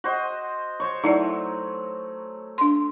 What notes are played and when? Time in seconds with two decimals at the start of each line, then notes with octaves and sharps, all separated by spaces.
0.04 F#4 C5 D#5
0.80 C5 C#5 C#6
1.04 F#3 A3 D#4 E4 D5
2.58 D4 C6